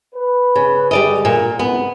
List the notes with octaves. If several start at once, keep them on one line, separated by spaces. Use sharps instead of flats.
B4
C#3
D3 G3 G#4 D5 D#5
A#2
F#1 C2 B3